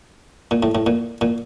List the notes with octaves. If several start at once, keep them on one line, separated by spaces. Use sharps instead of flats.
A#2
A2
A2
A#2
A#2